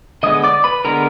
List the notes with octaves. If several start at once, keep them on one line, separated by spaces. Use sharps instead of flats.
D3 G#3 B3 D#5 D#6
D5 D6
B4 B5
D3 G#3 B3 A#4 A#5